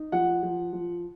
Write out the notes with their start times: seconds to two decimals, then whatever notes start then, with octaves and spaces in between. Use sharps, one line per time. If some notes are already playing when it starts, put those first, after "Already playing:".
Already playing: D#4
0.12 F3 F#5
0.43 F3
0.73 F3